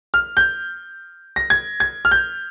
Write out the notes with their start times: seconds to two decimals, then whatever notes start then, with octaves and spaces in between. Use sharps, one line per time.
0.14 F6
0.37 G6
1.36 A#6
1.50 G#6
1.80 G#6
2.05 F6
2.11 G6